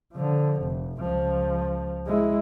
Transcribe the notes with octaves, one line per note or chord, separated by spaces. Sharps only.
D3 F3
F1
C#2 F3
G#3 E4